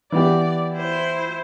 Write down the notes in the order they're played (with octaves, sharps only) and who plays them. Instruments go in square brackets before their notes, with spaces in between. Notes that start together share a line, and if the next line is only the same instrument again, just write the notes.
[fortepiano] E3 B3 G4 [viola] D5
[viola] E4 C5